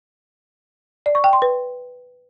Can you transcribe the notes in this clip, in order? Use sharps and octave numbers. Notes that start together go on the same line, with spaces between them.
D5
C#6
G5
C6
B4